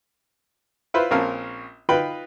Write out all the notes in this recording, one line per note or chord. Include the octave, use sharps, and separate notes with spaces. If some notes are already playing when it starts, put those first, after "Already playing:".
E4 F4 B4 C5
A#1 C4 C#4 A#4 F5 A5
D#4 F4 B4 G5 B5